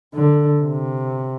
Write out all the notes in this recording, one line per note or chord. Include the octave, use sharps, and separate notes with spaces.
D3
C3